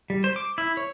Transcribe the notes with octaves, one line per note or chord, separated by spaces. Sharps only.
G3
C5
D6
E4
C#5